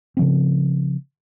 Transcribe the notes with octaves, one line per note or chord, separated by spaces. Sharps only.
C#3 F3 C4